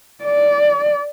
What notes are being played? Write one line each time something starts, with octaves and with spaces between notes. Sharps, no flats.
D5